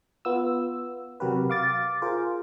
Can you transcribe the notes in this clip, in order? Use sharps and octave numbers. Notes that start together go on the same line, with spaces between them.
B3 F4 E6
C3 F#3 F#4 G4 A#4 B4
F5 D6 A6
F4 G#4 A#4 C5